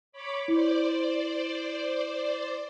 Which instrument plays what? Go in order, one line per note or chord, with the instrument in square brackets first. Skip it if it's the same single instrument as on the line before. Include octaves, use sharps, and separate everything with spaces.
[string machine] C#5 B5 D6
[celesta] E4 [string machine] C5 D5